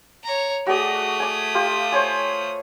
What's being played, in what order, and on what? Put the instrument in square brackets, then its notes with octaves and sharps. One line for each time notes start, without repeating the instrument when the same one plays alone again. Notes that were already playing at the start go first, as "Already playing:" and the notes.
[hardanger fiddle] C#5 A#5
[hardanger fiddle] A3 D#6 [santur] F#4 G#4 D5
[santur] G#5 D6
F4 G4
C5 C#5 G#5